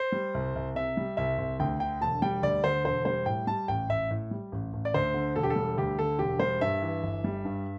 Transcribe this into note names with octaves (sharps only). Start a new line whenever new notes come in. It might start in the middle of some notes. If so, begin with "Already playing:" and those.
Already playing: C5
G3
C2
C2
C3 E5
G3
C2 E5
C2
D2 G5
D3 G5
E1 A5
G3 G5
D2 D5
D3 C5
E1 C5
G3 C5
A2 G5
G3 A5
A1 G5
A1 E5
A2
G3
A1
A1
D5
D2 C5
D3
E1 A4
G4
A4
G3
D2 G4
D3 A4
E1 G4
G3 C5
G2 E5
E3
G1
G3
G2